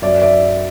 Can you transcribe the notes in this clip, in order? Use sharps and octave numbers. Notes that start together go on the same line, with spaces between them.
F#2 D5 E5
D5 E5